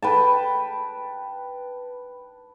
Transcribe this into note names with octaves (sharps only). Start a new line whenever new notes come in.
B4 G5 A5